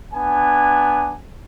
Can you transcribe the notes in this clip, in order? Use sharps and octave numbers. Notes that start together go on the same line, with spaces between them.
B3 D4 G#5